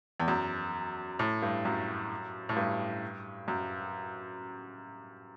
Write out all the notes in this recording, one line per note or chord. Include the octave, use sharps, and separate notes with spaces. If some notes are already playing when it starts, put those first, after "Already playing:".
E2
F#2
A2
G2
F#2
A2
G2
F#2